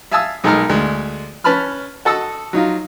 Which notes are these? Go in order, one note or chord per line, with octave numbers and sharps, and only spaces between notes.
E5 F5 G#5 A5 D#6 E6
B1 G#3 D#4 A4 A#4 F6
D2 G#3
C#4 B4 A5 B5 F6
F#4 A4 D#5 E6
F#3 D#4 F4